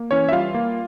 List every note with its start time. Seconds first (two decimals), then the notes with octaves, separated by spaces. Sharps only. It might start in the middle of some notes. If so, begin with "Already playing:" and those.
Already playing: A#3
0.11 E3 C#4 C#5
0.29 E5
0.32 G3 F4 F5
0.54 A#3